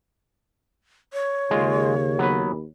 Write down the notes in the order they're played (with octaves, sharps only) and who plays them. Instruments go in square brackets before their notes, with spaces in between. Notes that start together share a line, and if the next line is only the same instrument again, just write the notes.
[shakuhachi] C#5
[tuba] D#2 [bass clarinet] C#3 [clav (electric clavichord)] G#3 F4
[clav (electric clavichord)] F#3 B3 B4